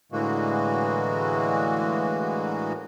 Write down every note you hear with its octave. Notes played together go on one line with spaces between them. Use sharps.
A2 D3 E3 G#3 A#3 F#4